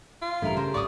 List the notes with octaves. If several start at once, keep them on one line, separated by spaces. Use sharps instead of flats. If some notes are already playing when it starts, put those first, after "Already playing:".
F4
A1 G2 C#3 E4 G4 A4 A#4
C#3 A#4 C5
D1 G#1 C#3 D5 C#6 D#6